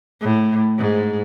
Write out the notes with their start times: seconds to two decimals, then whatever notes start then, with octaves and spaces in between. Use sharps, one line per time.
0.21 A2
0.78 G#2